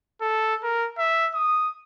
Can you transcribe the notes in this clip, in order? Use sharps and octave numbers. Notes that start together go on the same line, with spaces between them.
A4
A#4
E5
D#6